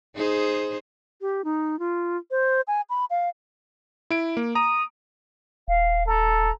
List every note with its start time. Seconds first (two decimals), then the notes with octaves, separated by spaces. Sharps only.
0.16 D#4 G#4 C5
1.21 G4
1.44 D#4
1.79 F4
2.31 C5
2.68 G#5
2.90 B5
3.10 F5
4.10 E4 D7
4.37 A#3
4.55 A#5 D#6
5.68 D#1 F5
6.07 A4 A#5